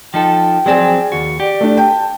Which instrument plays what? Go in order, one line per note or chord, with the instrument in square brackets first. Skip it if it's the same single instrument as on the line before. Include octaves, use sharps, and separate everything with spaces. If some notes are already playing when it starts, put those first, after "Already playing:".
[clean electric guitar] F3 D#4 A4 [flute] G5
[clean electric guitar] F3 F#3 C4 [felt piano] G#4 D5 G#5
[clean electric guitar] D#2 F#4
[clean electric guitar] G4 [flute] D5
[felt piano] A3 D4
[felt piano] G5 [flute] A5